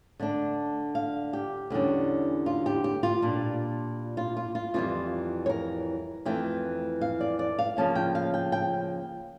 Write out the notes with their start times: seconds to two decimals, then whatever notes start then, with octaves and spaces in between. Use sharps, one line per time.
0.20 D3 A3 D4
0.95 F5
1.33 G4
1.70 E2 D3 G3 C#4
2.46 F4
2.66 G4
2.84 G4
3.03 F4
3.22 A#2 G3 D4
4.17 F4
4.37 F4
4.55 F4
4.74 F2 E3 G3 F4
5.46 C#5
5.49 A#4
6.25 F2 E3 A3 G5
7.01 F5
7.20 D5
7.39 D5
7.59 F5
7.77 C#3 F3 A#3 C#4 A5
7.95 G5
8.15 F5
8.34 G5
8.52 G5